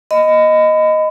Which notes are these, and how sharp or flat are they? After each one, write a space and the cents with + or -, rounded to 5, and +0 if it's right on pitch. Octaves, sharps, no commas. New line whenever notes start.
D#5 +0 B5 +30